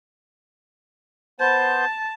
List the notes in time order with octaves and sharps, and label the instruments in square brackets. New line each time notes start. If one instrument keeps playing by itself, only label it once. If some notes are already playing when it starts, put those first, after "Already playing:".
[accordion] B3 C5 G6 [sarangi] A5